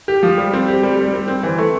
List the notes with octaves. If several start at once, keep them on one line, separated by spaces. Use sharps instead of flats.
G4
F3
G3
C4
G4
G3
G3
C4
C4
E3
A3